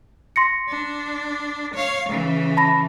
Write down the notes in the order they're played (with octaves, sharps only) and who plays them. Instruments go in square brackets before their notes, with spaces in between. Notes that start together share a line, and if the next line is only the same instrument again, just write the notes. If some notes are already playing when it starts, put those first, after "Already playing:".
[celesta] C6 A#6 C#7
[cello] D4
C#5 F5
C#3 E3
[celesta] A5 B5 A#6